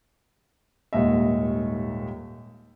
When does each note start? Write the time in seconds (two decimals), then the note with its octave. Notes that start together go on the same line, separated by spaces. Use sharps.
0.93 D#1 D#2 G#2 D#5 E5